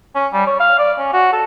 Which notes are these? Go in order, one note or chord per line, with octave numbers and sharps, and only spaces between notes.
C#4
G3
C#5
F5
D5
C#4
F#4
A4